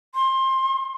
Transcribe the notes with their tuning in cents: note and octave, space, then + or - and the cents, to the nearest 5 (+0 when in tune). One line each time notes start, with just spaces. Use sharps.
C6 +20